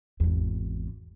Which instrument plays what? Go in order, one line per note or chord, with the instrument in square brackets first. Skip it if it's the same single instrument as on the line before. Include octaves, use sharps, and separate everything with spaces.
[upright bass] G#1 E2